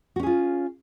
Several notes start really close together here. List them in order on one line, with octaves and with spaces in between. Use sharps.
F#4 C#4 G#4 F4